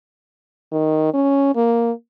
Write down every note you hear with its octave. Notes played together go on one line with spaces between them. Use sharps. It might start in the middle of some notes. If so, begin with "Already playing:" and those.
D#3
C#4
A#3